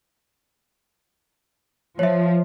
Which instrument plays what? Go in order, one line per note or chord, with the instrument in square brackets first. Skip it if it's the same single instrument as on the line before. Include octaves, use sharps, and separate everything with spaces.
[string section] F3 [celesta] C#5 E5